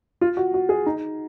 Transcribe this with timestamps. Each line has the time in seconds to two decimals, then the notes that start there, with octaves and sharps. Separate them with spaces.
0.21 F4
0.37 F#4
0.54 F#4
0.69 G#4
0.86 D#4